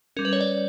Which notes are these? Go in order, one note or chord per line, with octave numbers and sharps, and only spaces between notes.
G3 C#4 A#4
B4
C#5
D5